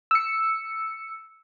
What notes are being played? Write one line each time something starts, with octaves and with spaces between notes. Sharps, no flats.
E6 C#7